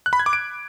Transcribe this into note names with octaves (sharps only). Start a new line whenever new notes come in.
F#6
B5
G#6
D6
D7